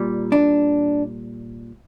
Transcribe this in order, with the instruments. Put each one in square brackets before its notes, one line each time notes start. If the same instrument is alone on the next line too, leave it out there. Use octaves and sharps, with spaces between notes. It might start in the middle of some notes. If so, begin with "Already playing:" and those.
Already playing: [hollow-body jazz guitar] A#2 G3
D4